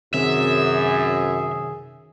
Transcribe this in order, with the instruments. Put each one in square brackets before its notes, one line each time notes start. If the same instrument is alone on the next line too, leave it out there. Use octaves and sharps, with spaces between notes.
[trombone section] F#2 [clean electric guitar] C3 D#3 C4 [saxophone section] G#4 [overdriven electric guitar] E5